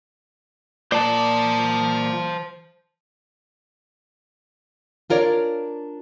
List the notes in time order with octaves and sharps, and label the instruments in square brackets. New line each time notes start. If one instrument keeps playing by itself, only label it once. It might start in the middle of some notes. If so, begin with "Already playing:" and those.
[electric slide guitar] A#2 D5 [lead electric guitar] C5 A5
[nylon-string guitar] D4 F4 A#4 C#5 D5